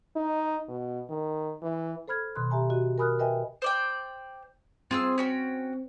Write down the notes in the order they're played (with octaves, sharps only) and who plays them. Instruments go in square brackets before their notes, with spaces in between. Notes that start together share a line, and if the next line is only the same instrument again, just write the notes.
[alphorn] D#4
B2
D#3
E3
[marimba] A4 C5 B5 F6 G#6
B2 D#3 B5 C6 F#6
G4 E5 G#5 A#5 B5
F#4 D#5
A#4 G#5 B5 D#6 F6 F#6
A#4 B4 D#5 E5 G5 G#5
[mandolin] C5 D5 G5
[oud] C4 [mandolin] F4 G#4 E6
[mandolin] C#4 F#4 G5